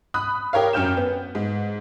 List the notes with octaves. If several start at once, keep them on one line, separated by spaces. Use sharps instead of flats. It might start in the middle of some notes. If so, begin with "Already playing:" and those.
B5 D#6 F#6
G4 A#4 C#5 F5
F#2 C#4 G5 F6 G6 E7
B3
G#2